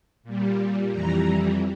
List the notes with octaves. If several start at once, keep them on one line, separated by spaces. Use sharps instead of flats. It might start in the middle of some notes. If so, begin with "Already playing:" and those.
A#2 G3
F2 E3 G3 A#5